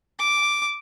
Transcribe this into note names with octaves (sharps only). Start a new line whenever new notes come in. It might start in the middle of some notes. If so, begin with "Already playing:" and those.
D6